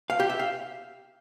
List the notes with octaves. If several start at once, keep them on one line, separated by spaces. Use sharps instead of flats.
F5
G4
E5
F5